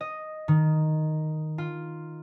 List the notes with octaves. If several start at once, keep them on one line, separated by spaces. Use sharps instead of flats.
D#5
D#3
F4